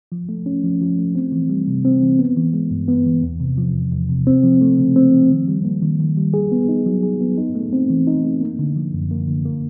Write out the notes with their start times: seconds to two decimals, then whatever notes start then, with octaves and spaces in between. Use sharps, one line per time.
0.12 F3
0.29 A3
0.46 C#4
0.64 F3
0.81 F3
0.98 A3
1.15 C4
1.32 E3
1.50 G3
1.67 C3
1.85 C4
2.02 E3
2.19 B3
2.37 E3
2.54 G#3
2.71 G2
2.88 B3
3.06 E3
3.23 E2
3.40 C3
3.58 F3
3.75 E2
3.92 E2
4.09 C3
4.27 C4
4.44 F3
4.61 A3
4.79 C#3
4.96 C4
5.13 F3
5.30 D#3
5.48 G3
5.65 A#3
5.82 D#3
6.00 D#3
6.17 G3
6.34 G#4
6.52 B3
6.69 D#4
6.86 F#3
7.03 G#4
7.21 B3
7.38 D#4
7.55 A3
7.73 C4
7.90 E3
8.07 D#4
8.24 A3
8.41 A#3
8.59 D3
8.76 F3
8.94 F#2
9.11 A#3
9.28 D3
9.45 A#3